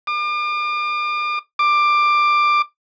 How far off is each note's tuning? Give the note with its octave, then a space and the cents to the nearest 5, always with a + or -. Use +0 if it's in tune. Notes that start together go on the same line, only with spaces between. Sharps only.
D6 +40
D6 +15